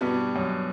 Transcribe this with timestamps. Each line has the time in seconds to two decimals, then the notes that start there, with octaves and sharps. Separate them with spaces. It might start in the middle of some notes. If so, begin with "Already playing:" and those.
0.01 G2 B2 G3 B3 F#4
0.36 F#2